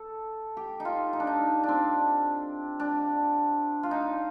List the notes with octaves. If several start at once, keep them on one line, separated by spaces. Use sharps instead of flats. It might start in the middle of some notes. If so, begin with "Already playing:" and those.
Already playing: A4
G4
D#4
F4
D#4
D4
D#4
C4 D4
D4
F4
D#4